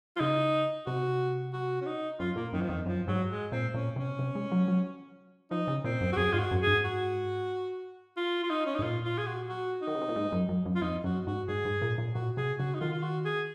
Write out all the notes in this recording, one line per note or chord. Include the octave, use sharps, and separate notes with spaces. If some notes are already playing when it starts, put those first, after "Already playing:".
F4
C#3 D#4
C3 F#4
F#4
C#4
D#4
F#2 F4
A#2 A#3
F#2 D#3
F3
F2 D#3
F#2 F3
G#2 F#3
G#3
A#2 C4
A#2 C#4
C3 C#4
C3
G#3
F#3
F#3
F3 D#4
C#3
A#2 C4
F#2
F#4
F#2 G#4
G#2 F4
F#4
F#2
G#2 G#4
F#4
F4
F4
D#4
C#4
D#4
G#2
A#2 F4
F4
G#4
F#4
F#4
D#4
D#3
C#3
C3
A#2
G#2
F#2
F#2
F#2
F4
F2 D#4
F#2 F#4
G#2 F#4
G#2 G#4
G#2
A#2
A#2
A#2 F#4
C3 G#4
C#3 F#4
D#4
D#3 F4
F4
F#4
G#4